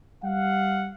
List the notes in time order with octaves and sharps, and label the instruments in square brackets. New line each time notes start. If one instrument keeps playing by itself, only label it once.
[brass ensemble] G3 F5 F#5